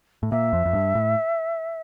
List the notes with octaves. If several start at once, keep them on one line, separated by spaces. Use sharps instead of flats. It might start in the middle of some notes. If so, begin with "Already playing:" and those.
A2
A#2 E5
F2
F2
G2
A2